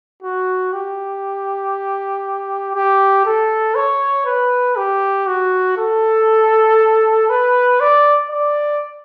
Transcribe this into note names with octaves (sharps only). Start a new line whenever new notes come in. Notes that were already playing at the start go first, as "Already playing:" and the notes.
F#4
G4
G4
A4
C#5
B4
G4
F#4
A4
B4
D5
D5